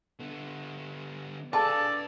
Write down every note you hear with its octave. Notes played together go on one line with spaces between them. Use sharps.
D3 B3
G#4 A4 B4 D5 F5 A5